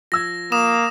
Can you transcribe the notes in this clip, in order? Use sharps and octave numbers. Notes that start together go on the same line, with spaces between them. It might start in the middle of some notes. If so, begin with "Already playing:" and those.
F3 E6 G#6 A#6
A#3 D#6 E7